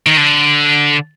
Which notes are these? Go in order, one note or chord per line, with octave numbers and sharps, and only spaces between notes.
D#3
D3